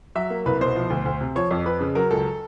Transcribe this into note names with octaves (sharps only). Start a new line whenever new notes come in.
F#3 E5
A#3
C2 B4
B2 C5
F3
D2
D2
C3
F3 C#5
F2
F2 B4
C#3
F#3 A#4
C#2 A4